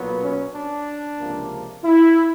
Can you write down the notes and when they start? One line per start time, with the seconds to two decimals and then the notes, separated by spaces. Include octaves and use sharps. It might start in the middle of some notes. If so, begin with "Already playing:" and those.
Already playing: B1 A#2 F#3 B3
0.22 C#4
0.54 D4
1.19 C#2 C3 F3 A#3
1.83 E4